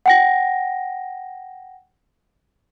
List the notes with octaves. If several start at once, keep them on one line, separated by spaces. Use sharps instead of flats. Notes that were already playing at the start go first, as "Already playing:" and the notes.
F#5 G5 A#6